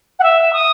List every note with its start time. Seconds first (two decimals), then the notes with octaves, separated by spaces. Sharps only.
0.19 F#5
0.23 E5
0.53 D#6